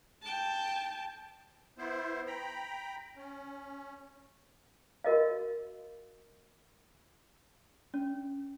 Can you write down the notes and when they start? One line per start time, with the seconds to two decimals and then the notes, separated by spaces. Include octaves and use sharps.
0.22 G5 A5
1.78 B3 E4 C5
2.27 G5 A#5 B5
3.16 C#4
5.04 F#4 A#4 D#5 F5
7.94 C#4